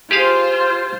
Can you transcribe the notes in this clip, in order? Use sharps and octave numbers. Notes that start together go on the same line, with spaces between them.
F4 G4 G#4 C5 F5